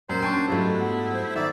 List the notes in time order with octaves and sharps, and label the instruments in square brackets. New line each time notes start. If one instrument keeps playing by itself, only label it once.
[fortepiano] F#2 [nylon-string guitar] A#2 [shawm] C5
[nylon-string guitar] C#4 [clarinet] D4 [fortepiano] G5 A5 C#6
[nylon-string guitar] G#2 F#3 F4 [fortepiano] G3 A3 [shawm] E4
[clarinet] B3
C5
[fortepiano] D#3 [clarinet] A4 [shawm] D5 [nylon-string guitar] E5